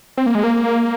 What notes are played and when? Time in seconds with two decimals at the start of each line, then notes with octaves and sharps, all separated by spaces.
0.18 C4
0.26 A#3
0.35 G#3
0.44 A#3